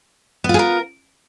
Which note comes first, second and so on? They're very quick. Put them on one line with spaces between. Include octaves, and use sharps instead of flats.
B3 F4 G#4 A#4